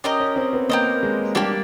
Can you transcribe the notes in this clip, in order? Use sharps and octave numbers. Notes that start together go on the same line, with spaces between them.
C#4 G4 A#4 D#5
C#4
C4
B3
A#3 G4 A#4 D#5
G#3
G3 A#3 D4 G4